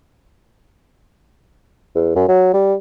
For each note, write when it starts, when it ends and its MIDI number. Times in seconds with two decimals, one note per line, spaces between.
1.95 2.12 40
2.16 2.25 42
2.28 2.50 54
2.53 2.74 55